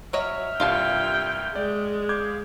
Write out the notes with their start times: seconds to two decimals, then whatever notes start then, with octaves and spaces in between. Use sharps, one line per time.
0.13 F#3 C#5 D#5 E5 F6
0.60 C2 G2 F4 F5 G5 A5
1.56 G#3 D5
2.09 D5 E5 F5 D6 G6 G#6